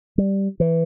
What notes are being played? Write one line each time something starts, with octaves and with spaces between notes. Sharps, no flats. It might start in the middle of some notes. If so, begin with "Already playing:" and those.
G3
E3